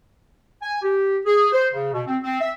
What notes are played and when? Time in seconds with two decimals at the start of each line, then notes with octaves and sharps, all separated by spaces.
0.62 G#5
0.82 G4
1.25 G#4
1.52 C5
1.73 C#3
1.93 B2
2.07 C4
2.23 C4
2.41 E5